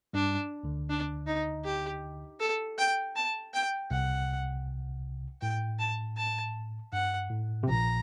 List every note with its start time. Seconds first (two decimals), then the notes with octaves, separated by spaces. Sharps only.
0.13 G2 G3 D4
0.63 D2 D3
0.90 D4
1.27 D#4
1.65 G4
2.40 A4
2.78 G5
3.16 A5
3.54 G5
3.91 C2 C3 F#5
5.41 A2 G5
5.79 A5
6.17 A5
6.93 G2 F#5
7.31 A2
7.63 C3
7.68 A#1 A#2 A#5